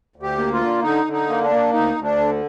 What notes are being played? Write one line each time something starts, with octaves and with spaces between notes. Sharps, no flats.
D2
G4
A#3
F4
D3
D3 D#4
D3
D#4
A#3
D4
A#3
D2 D#4
D2
D4
D3